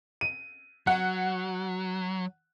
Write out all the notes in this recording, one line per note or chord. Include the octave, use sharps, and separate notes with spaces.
D#7
F#3 F#5